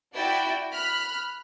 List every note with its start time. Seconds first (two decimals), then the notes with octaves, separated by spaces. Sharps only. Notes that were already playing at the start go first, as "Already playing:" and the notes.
0.14 E4 F#4 D5 G5
0.70 B5 F6 F#6